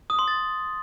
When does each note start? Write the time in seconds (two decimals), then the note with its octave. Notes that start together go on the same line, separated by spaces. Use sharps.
0.10 D#6
0.19 C6
0.28 A6